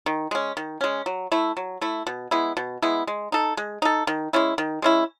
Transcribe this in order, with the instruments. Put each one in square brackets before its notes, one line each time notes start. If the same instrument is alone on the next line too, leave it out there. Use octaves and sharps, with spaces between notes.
[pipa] D#3
G#3 C#4
D#3
G#3 C#4
F#3
A3 E4
F#3
A3 E4
B2
G#3 B3 E4
B2
G#3 B3 E4
G#3
D#4 A4
G#3
D#4 A4
D#3
G#3 C#4 E4
D#3
G#3 C#4 E4